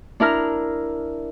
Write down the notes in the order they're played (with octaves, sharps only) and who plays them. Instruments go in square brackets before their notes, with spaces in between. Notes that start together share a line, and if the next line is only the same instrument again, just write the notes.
[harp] D4 E4 A#4 F6